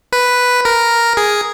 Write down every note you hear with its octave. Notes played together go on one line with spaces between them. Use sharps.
B4
A#4
G#4